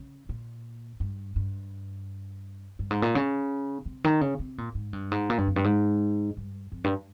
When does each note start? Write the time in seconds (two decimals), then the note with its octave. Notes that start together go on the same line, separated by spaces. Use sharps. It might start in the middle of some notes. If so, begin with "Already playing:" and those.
Already playing: C#3
0.29 A#2
1.00 G2
1.36 G2
2.79 G2
2.91 G#2
3.02 A#2
3.15 C#3
3.86 C3
4.04 D#3
4.21 C#3
4.39 C3
4.58 A#2
4.75 G#2
4.93 G2
5.11 G#2
5.30 A#2
5.38 G2
5.47 F2
5.56 G2
5.64 G#2
6.37 G2
6.72 F2
6.84 G2